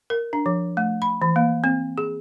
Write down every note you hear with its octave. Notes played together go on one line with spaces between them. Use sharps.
A#4
D4
F3
A3
B5
E3
A#3
C4
G#4